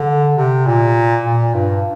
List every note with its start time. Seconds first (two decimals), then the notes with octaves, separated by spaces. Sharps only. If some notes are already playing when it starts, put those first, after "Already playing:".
Already playing: D3
0.37 C3
0.66 A#2
1.26 A#2
1.54 G2